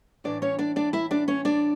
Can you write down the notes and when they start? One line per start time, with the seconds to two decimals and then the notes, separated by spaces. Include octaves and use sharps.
0.24 A2 E3 D4 D5
0.42 C#4 C#5
0.59 D4 D5
0.76 D4 D5
0.93 E4 E5
1.11 D4 D5
1.28 C#4 C#5
1.45 D4 D5